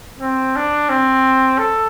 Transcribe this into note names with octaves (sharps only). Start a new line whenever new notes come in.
C4
D4
C4
A4